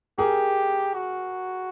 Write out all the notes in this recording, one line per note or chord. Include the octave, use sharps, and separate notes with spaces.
G4 G#4 A#4
F#4